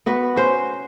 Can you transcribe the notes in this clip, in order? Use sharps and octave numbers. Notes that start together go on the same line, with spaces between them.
B3 F#4 B4
C#4 F#4 C5